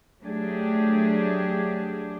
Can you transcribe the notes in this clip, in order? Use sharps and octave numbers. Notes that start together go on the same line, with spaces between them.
F#3 A3 D4 G4 G#4